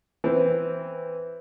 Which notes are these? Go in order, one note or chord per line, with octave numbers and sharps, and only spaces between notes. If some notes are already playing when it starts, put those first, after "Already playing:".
E3 C4